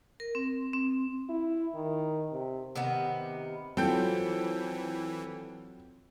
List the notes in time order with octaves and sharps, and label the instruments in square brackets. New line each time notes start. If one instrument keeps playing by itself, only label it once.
[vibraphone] A#4
C4
C4
[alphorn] E4
D#3
C3
[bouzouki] C3 D#3 B3
[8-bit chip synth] E3 [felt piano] F#3 F4 [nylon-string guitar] C4 [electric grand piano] A4 G5 G6